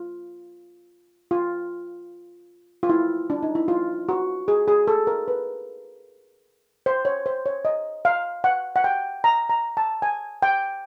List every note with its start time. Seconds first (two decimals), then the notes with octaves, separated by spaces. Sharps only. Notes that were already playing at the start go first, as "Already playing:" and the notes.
Already playing: F4
1.31 F4
2.83 F4
2.89 E4
3.30 D4
3.43 D#4
3.55 E4
3.68 F4
4.09 F#4
4.48 G#4
4.68 G#4
4.88 A4
5.07 A#4
5.28 B4
6.86 C5
7.05 C#5
7.26 C5
7.46 C#5
7.65 D#5
8.05 F5
8.44 F#5
8.76 F#5
8.84 G5
9.24 A#5
9.49 A#5
9.77 A5
10.02 G#5
10.42 G5